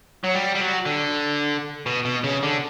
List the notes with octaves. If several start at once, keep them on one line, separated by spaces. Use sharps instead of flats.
F#3
G3
G3
F#3
D3
B2
B2
C#3
D3